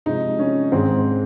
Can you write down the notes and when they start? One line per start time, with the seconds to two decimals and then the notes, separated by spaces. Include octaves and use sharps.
0.06 C3 F3 G#3 D#4
0.39 C#4
0.72 G#2 D#3 G#3 C4